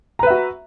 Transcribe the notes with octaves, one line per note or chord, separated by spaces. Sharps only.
F#4 B4 E5 A#5